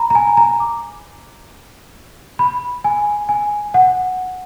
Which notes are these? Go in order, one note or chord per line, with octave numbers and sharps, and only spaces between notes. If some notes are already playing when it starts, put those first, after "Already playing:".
Already playing: A#5 B5
A#5
G#5
A#5
D6
B5
G#5
G#5
F#5